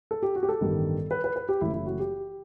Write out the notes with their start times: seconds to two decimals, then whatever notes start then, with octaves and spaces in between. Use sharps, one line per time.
0.11 A4
0.23 G4
0.36 F#4
0.43 G4
0.49 A4
0.61 A1 G2 D#3 G3 B3
1.11 B4
1.24 B4
1.36 B4
1.49 G4
1.61 F#1 F#2 E3 A3 E4
1.74 E4
1.87 F#4
1.99 G4